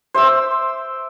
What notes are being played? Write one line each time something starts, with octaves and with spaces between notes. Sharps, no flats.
C5 E5 D6 E6